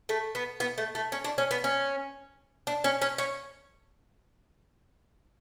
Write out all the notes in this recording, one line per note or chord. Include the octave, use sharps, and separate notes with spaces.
A3
B3
B3
A3
A3
C#4
D4
C#4
B3
C#4
D4
C#4
C#4
C#4